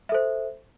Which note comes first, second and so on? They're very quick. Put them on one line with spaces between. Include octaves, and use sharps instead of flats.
E5 A4 C5